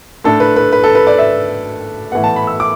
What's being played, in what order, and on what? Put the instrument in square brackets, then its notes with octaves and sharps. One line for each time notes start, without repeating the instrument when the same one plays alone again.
[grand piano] A2 A3 D4 A4
B4
B4
B4
A4
B4
D5
E5
A2 E3 B3 F#5
A5
B5
E6
D6